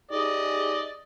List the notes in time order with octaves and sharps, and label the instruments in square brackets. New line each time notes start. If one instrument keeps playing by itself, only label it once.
[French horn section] D#4 G4 G#4 [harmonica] D5 D#5